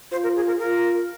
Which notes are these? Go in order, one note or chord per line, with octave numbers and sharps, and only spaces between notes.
F4 C5
A#4
G#4
A#4
F4 A#4